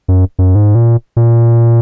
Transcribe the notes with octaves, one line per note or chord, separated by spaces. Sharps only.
F#2
F#2
G#2
A#2
A#2